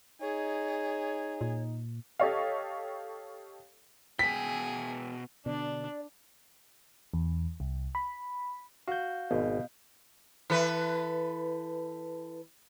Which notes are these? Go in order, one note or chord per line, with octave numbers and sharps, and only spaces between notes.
D#4 G#4 C#5
A#2
G4 A4 C#5 D#5 F5
B2 G#4 G5 B6
B2 D3 D4 D5
E2
C2
B5
F#4 F5 G6
G#1 B2
E3 A4 B4